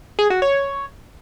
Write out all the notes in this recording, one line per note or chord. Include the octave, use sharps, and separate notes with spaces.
G#4
F#4
C#5